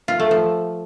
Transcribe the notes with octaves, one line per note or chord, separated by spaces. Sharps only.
F4
A3
F3